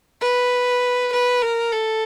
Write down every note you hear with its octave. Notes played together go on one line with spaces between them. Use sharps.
B4
B4
A#4
A4